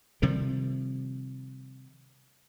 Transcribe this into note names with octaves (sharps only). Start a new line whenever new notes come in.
C3 D#3 F3 G3